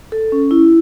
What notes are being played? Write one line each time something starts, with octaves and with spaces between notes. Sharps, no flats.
A4
C#4
E4